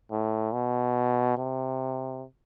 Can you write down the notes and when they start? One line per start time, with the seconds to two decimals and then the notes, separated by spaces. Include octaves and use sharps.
0.11 A2
0.53 B2
1.37 C3